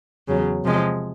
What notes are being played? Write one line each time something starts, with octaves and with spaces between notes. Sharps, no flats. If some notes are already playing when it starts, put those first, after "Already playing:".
E2 C#3 F#3
C3 F3 G#3